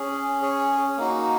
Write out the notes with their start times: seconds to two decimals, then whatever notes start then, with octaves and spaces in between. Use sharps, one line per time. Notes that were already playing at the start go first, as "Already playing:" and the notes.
Already playing: C#4 G#4
0.42 G#4 C#5
0.97 A#3 D#4 F#4